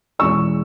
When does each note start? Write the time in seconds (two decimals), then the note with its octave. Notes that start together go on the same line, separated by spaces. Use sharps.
0.19 E2 B2 G#3 C#4 E4 C#6 E6